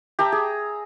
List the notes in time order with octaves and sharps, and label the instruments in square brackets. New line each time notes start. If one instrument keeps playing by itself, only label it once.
[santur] G4 A5 A#5 E6
G#4